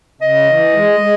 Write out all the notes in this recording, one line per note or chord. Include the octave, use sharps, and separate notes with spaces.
C#3 D#5
E3
G#3
G#3